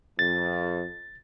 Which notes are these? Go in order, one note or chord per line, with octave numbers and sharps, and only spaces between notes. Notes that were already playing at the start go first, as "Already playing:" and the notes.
F2 A6